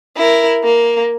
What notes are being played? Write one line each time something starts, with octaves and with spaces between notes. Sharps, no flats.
E4 A#4
A#3